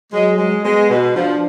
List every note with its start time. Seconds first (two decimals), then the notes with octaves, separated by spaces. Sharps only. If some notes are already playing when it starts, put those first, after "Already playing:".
0.13 F#3 G#3
0.38 G#3
0.65 G#3 B3
0.90 B2
1.15 F3 D4